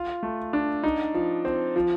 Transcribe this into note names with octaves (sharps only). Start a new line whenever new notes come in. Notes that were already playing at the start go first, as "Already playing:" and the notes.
Already playing: F4
A3
D4
D#4
F3
C4
F3